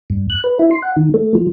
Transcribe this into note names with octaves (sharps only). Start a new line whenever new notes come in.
G2
F#6
B4
E4
C6
F#5
D#3
A3
F3